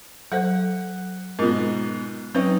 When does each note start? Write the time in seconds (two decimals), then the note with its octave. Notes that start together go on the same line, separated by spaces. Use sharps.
0.32 F#3 A4 C5 F#5
1.39 G#2 B2 F4 A#4
2.35 F#3 C4 C#4 D#4 B4